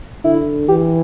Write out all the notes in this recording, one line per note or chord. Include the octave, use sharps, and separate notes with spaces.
D3 E4
E3 G4